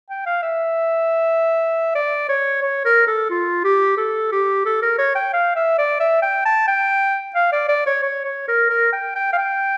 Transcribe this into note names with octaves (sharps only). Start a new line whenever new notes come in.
G5
F5
E5
D5
C#5
C#5
A#4
A4
F4
G4
A4
G4
A4
A#4
C#5
G5
F5
E5
D5
E5
G5
A5
G5
F5
D5
D5
C#5
C#5
C#5
A#4
A#4
G5
G5
F5
G5